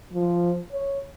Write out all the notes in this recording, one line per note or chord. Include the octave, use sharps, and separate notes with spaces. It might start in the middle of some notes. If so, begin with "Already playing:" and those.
F3
C#5